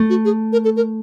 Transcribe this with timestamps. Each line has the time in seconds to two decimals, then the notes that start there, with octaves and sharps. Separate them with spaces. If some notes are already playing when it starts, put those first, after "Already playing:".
Already playing: A3
0.10 F#4
0.25 G#4
0.53 A#4
0.64 A4
0.76 A#4